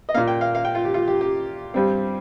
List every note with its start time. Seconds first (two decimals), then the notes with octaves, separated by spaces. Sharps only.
0.09 D#5
0.14 A#3 F5
0.17 A#2
0.28 G5
0.41 F5
0.55 F5
0.65 G5
0.75 F4
0.85 G4
0.94 F4
1.08 G4
1.21 G4
1.74 G2 G3 C4